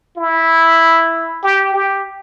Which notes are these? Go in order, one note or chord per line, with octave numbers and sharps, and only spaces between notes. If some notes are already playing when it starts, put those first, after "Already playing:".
E4
G4
G4